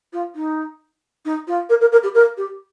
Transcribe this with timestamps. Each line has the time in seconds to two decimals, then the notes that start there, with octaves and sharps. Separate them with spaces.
0.13 F4
0.35 D#4
1.25 D#4
1.47 F4
1.70 A#4
1.81 A#4
1.92 A#4
2.03 G4
2.15 A#4
2.37 G4